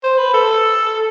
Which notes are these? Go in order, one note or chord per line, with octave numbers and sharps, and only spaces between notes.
C5
B4
A4